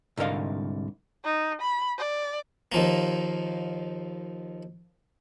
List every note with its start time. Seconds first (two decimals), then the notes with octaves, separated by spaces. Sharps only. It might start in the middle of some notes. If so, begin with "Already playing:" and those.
0.17 C2 G#2 D3 A#4 D#5 F5
1.25 D#4
1.62 B5
1.98 D5
2.72 D#2 F3 A#3